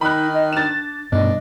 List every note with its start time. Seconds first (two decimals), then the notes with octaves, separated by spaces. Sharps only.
0.01 D#3 D#4 B5 F#6
0.34 D#5
0.53 D4 A6 E7
1.12 G2 B2 D4 D#5